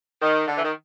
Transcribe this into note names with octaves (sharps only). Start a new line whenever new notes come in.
D#3
D3
E3
D#3